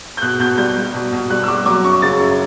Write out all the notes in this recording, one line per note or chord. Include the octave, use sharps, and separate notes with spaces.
G6
B2 F#6
B2 G6
G3 G6
G3
B2
B2
G3 F#6
E6
G3 D6
F#3 D6
F#2 C#6
C#3 A6
F#2